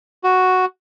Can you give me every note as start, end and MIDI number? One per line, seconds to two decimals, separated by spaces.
0.24 0.65 66